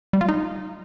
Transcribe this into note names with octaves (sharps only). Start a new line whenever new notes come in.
G3
F4
D#4